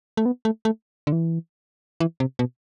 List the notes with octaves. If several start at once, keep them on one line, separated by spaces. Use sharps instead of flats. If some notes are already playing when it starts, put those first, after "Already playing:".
A3
B3
A3
A3
D3
E3
E3
C3
B2